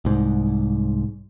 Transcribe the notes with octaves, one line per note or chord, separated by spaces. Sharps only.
C2 G#2